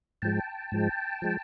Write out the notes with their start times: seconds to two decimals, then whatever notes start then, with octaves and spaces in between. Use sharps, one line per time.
0.22 G#2 F3 G#3 G5 A5
0.72 G#2 F3 G#3
1.22 F3 G#3